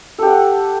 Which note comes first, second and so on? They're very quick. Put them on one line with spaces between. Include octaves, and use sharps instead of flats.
A4 G4 F#5